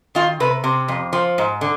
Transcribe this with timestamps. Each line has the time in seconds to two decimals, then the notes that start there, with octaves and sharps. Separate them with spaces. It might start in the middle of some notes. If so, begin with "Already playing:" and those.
0.15 D#3 F4
0.40 C3 B4
0.64 C3
0.88 F2
1.13 F3
1.38 G#2
1.61 D3